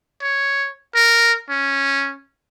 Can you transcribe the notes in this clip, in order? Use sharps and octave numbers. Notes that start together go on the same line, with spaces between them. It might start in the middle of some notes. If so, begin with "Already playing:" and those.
C#5
A#4
C#4